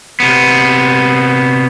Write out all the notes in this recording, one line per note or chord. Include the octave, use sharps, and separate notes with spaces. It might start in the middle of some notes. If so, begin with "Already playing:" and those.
C3 B3